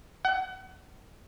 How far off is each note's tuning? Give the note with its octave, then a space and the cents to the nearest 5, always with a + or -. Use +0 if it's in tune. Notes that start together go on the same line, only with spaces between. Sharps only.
F#5 +35